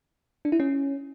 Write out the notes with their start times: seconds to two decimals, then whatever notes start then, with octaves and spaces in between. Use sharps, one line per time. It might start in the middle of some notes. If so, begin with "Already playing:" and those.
0.45 D4
0.52 E4
0.60 C#4